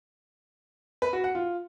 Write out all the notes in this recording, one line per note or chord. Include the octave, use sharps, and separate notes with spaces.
B4
F#4
F#5
F4